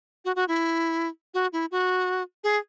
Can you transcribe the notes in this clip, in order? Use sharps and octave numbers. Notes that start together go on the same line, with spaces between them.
F#4
F#4
E4
F#4
E4
F#4
G#4